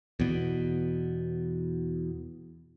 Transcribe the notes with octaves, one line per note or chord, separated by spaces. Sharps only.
E2 B2